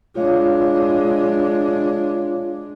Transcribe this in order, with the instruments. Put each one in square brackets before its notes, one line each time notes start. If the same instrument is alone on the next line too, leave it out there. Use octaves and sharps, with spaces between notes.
[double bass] G#3 D4 [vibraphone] F4 C#5 F5